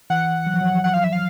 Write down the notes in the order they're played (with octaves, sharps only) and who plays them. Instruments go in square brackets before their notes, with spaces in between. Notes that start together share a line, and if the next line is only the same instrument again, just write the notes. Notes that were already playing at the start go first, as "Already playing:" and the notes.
[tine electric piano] E3 [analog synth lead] F#5
[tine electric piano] F#3
F3
F#3
[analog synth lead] F#5
F5
E5
F5